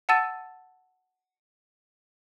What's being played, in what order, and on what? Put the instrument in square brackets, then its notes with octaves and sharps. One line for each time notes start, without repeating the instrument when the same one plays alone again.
[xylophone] F#5 A5 E6 A6 D#7